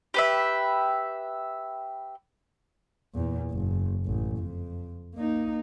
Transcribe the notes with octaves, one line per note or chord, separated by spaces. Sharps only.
G4 B4 E5
E2 A#2
F#1
A1
F2
A#3 D#4